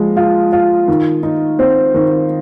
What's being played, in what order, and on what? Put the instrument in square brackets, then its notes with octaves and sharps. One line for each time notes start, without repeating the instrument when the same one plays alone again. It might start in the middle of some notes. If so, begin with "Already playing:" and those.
Already playing: [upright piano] F3 G#3
F4
F4
D#3
D#4
C4
D#3